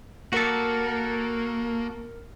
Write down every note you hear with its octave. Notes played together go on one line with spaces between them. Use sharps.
A#3 F#4 A4 A#4 C#7